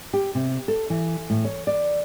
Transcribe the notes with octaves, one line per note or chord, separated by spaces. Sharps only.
G4
C3
A4
E3
A2
C#5
D5